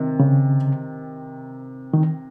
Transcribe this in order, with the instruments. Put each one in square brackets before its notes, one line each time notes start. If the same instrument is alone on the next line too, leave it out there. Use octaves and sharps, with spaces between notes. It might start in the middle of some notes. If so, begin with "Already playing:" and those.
Already playing: [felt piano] C3 D#3
[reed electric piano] C#3
D#3